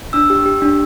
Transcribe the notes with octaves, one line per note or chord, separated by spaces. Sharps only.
D4 E6
G4
G4
D4